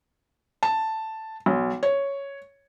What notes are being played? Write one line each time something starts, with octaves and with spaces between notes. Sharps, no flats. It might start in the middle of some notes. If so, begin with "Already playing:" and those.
A5
B1
C#5